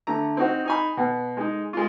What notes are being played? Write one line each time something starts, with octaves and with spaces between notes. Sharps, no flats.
D3 A3 A#5
C4 D#4 F#4
D#4 G#5 B5
B2 F#5
G#3 D#4
G#3 F4